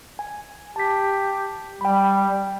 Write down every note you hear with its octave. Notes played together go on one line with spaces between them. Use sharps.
G#5
G4 A5 B6
G3 G5 B5